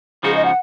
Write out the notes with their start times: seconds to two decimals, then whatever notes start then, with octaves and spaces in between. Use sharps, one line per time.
0.23 C#3 F3 G#3 D#4 F#4 G#4
0.34 D#5
0.44 F#5